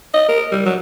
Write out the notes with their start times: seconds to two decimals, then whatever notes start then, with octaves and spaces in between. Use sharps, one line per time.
0.14 D#5
0.28 A#4
0.52 G3
0.65 F#3